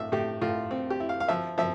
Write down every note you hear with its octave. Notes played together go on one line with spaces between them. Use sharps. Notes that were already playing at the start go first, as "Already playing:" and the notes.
Already playing: A2 E5 F5
A2 G4
A2 F4
C4
G4
E4
F5
F5
F3 E5
F3 E5